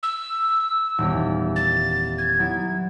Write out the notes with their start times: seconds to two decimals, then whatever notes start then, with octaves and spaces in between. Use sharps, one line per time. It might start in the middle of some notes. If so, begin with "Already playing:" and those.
0.03 E6
0.98 D#1 E2
1.56 A6
2.18 G#6
2.39 F#3 B3 E4